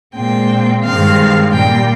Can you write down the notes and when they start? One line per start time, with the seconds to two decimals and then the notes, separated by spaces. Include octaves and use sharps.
0.15 A#2 G#3 C4 G5
0.84 G2 D#3 G#3 C4 F5
1.53 A#2 G3 A#3 G5